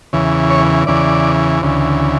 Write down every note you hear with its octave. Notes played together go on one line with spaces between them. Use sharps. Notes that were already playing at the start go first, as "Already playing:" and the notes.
E2 C#3 E3
C#5
E2 C#3 E3 D5
D2 C#3 E3